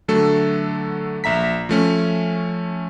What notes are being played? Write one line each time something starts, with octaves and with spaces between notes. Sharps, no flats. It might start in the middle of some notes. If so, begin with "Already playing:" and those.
D3 F#3 A3 A4
A#1 E5 A#5 B6
F3 A3 C#4